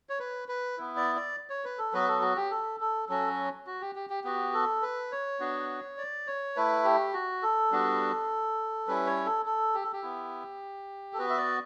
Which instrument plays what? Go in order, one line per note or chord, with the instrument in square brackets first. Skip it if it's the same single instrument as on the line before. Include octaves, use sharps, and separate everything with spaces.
[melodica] C#5
B4
B4
B3 E4
D5
D5
C#5
B4
A4
F#3 B3 F#4 B4
A4
F#4
G4
A4
A4
F#3 C#4 F#4 A4
F#4
G4
G4
G4
B3 F#4 G4
A4
B4
C#5
B3 D4 F#4
D5
C#5
A3 E4 B4
G4
F#4
A4
G3 B3 D4 F#4
G3 C#4 E4 B4
C#5
A4
A4
G4
A4
G4
B3 E4
A4
B3 F#4 B4
E5
D5